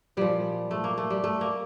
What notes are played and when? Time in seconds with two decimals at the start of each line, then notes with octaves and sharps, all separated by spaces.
0.17 A#2 F3 G3
0.71 A3
0.84 A#3
0.98 A3
1.10 G3
1.24 A3
1.41 A#3